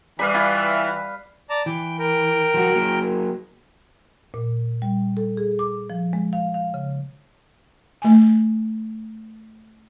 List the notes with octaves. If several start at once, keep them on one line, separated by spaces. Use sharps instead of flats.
E3 G3 B4 F5 B5
E4 F4
D5 A5 A#5
E3 G5
A#4 G5
F3 F#4
F#3 A#3
A#2
G3
A4
G#4
D6
F3
G#3
F5
F5
C#3
A3 G#5